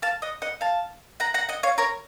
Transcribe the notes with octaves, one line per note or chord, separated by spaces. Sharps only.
F5 A5
D#5 F#5
D#5 F#5
F5 A5
F#5 A#5
F#5 A#5
D#5 F#5
C#5 F5
A#4 C#5